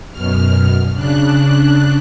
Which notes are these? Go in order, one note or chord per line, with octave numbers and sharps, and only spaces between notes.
F#2 B2 F6
C#3 D4 F#6